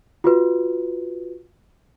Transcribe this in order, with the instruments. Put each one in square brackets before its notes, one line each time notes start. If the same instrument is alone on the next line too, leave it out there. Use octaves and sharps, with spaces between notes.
[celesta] F4 F#4 B4